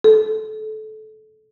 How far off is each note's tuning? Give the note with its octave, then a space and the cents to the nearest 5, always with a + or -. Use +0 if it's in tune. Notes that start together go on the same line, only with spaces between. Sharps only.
A4 -25